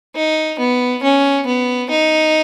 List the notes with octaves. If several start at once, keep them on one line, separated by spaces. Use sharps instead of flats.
D#4
B3
C#4
B3
D#4